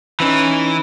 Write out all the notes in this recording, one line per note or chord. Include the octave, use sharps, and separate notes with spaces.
E3 C#4 D#4